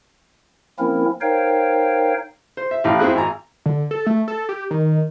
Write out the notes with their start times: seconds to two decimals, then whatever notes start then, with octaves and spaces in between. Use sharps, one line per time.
0.79 F3 A#3 C4 C#4 E4 A#4
1.21 D#4 A#4 C5 C#5 F5 G5
2.57 C5
2.71 E5
2.84 A1 A2 G4 F5
2.99 F2 C4 E4 G#4 F#6
3.15 G#1 G#5 A#5
3.66 D3
3.91 A4
4.06 A3
4.28 A4
4.49 G4
4.71 D#3